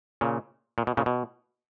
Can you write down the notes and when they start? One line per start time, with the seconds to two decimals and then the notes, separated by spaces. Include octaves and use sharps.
0.21 A#2 C#3
0.78 A#2
0.87 B2
0.97 A#2 C#3
1.06 B2